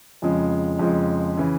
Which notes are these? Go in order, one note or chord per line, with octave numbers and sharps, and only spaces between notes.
F2 C#3 F3 G#3
F2 C#3 F3 G#3
C#3 E3